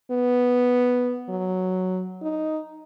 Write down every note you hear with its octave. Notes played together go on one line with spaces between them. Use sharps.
B3
F#3
D#4